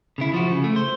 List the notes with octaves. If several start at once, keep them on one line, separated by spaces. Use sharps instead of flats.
C#3 E4
F3 F#4
C#3
A3
C5